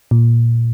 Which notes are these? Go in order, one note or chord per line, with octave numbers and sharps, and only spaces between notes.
A#2